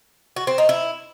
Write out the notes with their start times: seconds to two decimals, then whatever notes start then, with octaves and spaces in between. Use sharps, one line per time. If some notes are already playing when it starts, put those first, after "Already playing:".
0.36 F#4
0.47 C4
0.58 D#4
0.69 E4